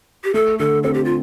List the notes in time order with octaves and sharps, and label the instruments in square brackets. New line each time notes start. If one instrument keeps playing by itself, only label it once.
[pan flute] G4
[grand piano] A3 [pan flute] A4
[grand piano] D3 [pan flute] A4
[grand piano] C4 [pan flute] A4
[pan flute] G4
F4